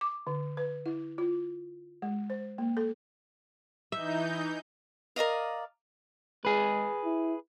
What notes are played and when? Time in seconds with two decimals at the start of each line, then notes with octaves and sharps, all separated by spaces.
0.01 D6
0.27 D3
0.57 B4
0.86 E4
1.18 F4
2.02 G#3
2.30 C5
2.58 A#3
2.77 A4
3.92 E3 D#4 E5 G6
5.16 A#4 D5 D#5 F5
6.45 G#3 G#4 B4
7.04 E4